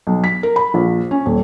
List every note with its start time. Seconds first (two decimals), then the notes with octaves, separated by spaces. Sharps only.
0.07 B1
0.24 B6
0.43 A#4
0.56 B5
0.74 A#1
1.11 C#4
1.26 D#1